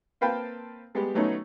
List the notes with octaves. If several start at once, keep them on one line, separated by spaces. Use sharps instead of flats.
A#3 C4 B4 F5 G5 A5
G3 G#3 B3 G4
D#3 F#3 A3 B3 C#4 D#4